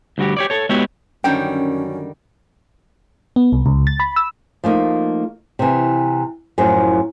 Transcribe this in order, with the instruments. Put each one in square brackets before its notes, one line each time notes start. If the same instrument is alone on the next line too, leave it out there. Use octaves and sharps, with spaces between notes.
[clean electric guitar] D2 G3 F#4 G4
G4 C#5 D5
A4 C#5
G#3 B3 E4 F#4 G4 C#5
[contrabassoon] F#2 [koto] D3 D#3 G3 [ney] C#4 [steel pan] G5
[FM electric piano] B3
C2
C#2
A6
B5
E6
[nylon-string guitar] F3 A3 A#3 D#4
C3 E3
F#2 A2 F3